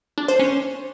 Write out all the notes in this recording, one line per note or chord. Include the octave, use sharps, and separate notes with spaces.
D4
C5
C#4